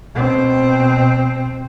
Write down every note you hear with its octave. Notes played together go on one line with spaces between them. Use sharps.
B2 C4